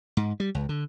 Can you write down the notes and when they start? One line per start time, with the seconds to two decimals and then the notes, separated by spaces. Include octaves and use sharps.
0.17 G#2
0.40 G3
0.55 C#2
0.69 D3